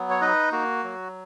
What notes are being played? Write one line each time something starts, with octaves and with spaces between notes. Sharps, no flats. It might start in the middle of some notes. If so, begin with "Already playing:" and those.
Already playing: F#3 B3
C#5
D#4 B4 D#5
A#3 F#4
F#3